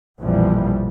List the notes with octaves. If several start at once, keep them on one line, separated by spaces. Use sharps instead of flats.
A#1 F2 B2 E3 F3 G3